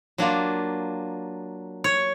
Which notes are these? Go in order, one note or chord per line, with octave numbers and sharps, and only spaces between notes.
F#3 A#3 D4 F4
C#5